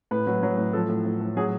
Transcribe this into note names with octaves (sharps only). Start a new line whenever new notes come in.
A2 B4
F#3
F#3
A2
F3 A4
A2
A2
A2
F#3 G#4